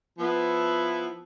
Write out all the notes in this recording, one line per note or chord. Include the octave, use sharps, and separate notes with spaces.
F3 B3 E4